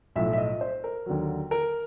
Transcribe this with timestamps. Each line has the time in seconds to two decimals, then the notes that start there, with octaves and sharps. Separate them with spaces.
0.16 B1 A2 F3 E5
0.33 E5
0.38 D#5
0.61 C5
0.84 A#4
1.06 D#2 D3 F#3
1.51 A#4